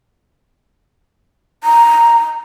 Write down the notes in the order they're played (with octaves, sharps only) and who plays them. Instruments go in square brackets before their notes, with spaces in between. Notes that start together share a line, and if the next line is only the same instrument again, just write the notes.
[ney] A#5